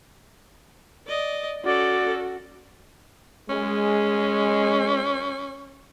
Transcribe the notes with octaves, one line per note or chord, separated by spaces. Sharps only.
D5 D#5
C#4 F#4 A4 D5
G#3 C#4